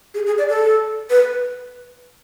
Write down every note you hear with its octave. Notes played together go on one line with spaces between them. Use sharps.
G#4
G#4
D5
A4
B4